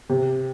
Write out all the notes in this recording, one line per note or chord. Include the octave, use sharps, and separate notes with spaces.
C3